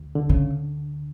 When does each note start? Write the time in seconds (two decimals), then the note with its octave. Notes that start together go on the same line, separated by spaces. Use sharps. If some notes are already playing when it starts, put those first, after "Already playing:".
Already playing: D2
0.15 D3
0.29 C#3